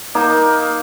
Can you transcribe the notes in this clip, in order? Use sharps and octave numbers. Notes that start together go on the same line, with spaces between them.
A#3 D#4